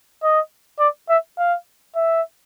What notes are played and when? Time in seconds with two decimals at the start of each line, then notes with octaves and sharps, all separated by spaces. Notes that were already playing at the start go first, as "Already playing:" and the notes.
0.23 D#5
0.79 D5
1.09 E5
1.38 F5
1.96 E5